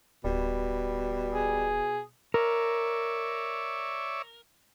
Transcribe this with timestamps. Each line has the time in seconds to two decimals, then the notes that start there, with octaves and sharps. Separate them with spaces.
0.25 D1 B2 G3
1.34 G#4
2.34 A#4 C#5 D5 E5